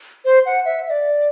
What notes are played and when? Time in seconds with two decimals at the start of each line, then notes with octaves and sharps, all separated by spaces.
0.25 C5
0.46 F#5
0.65 E5
0.86 E5
0.90 D5